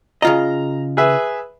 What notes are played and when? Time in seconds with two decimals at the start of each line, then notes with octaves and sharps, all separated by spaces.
0.22 C#3 F4 D#5 A#5
0.97 G#4 B4 E5